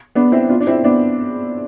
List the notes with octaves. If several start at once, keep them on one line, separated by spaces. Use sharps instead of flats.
B3 D4
C4 E4
D4 F4
D4
C4 E4
B3 D4